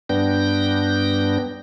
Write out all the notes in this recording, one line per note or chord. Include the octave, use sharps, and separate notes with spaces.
G2 B3 D4 G5 G6 A#6